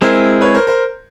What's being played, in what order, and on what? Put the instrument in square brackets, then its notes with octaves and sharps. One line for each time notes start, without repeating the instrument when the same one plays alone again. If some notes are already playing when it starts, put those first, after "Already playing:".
[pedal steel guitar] G#3 C4 E4 G#4 [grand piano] A#4 C5
[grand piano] B4 C#5
A#4 C5
A#4 C5